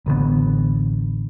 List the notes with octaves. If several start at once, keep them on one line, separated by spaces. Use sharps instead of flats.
A1 D3 D#3 B3